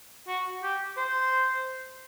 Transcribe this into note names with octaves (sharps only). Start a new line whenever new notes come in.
F#4
G4
C5